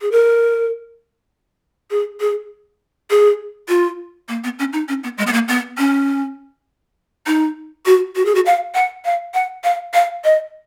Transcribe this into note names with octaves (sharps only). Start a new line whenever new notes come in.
G#4
A#4
G#4
G#4
G#4
F4
A#3
B3
C#4
D#4
C#4
B3
G#3
B3
A#3
B3
C#4
D#4
F#4
F#4
G#4
F#4
F5
F#5
F5
F#5
F5
F5
D#5